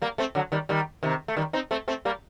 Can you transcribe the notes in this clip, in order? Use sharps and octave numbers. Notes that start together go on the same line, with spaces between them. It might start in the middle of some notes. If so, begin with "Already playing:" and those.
G3 A#3
A3 C4
D3 F#3
D#3 G3
D#3 G3
C3 D#3
A3
D#3 G3
C4 D#4
A3 C4
A3 C4
G3 A#3